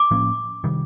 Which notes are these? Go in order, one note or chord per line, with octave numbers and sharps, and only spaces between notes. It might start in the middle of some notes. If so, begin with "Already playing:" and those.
Already playing: D6
A2 F3 A#3 C#4
C3 D#3 G3